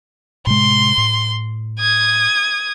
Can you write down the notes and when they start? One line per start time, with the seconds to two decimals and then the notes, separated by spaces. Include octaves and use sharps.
0.47 A2 C3 G#3 C6
0.98 A2
1.79 D#6 G#6